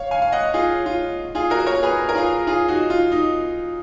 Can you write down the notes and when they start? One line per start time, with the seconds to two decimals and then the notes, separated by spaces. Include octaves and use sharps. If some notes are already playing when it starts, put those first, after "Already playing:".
Already playing: C#5 F5
0.11 F5 G#5
0.22 F5
0.32 D#5 F#5
0.54 F4 G#4
0.86 F4
1.35 F4 G#4
1.50 F#4 A#4
1.66 A#4 C#5
1.83 G#4 B4
2.09 A#4
2.15 F4 G#4
2.47 F4 G#4
2.68 D#4 F#4
2.90 F4
3.12 D#4